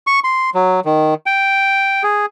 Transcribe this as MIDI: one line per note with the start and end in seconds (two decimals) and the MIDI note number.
0.07 0.20 85
0.24 0.50 84
0.55 0.80 54
0.85 1.14 51
1.26 2.03 79
2.03 2.26 68